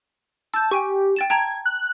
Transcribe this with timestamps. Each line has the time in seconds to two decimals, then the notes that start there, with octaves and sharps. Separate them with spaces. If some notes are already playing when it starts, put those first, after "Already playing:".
0.54 A5 E6 G6
0.71 G4 G5 G#5 C#6
1.16 G5 A6 E7
1.30 G5 A5 A#5 G#6
1.66 F#6